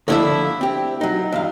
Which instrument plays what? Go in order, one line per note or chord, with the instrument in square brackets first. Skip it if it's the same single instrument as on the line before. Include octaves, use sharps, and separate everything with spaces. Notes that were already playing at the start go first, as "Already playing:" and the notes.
[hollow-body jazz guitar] D3 F3 A3 [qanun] D4 E4 E5
[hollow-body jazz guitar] C4 G4
F#3 D#4
E2 G2 F5